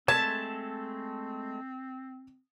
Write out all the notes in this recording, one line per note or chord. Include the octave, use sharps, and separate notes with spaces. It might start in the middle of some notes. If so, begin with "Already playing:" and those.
G#3 A3 C4 A4 A5 G#6 B6 E7